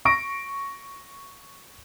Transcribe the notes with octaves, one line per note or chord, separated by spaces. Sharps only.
C#6 A#6 D7